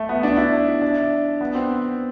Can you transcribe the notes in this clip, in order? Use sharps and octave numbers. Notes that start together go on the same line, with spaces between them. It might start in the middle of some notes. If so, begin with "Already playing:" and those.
Already playing: A3
B3
D4
E4
D4
B3
C4